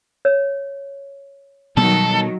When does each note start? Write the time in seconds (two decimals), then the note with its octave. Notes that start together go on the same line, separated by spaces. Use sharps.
0.25 C#5
1.77 B2 D#3 F#3 G3 B3 A4